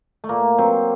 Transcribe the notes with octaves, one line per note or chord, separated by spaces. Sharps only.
A3
A#2 A#3
F#3 C4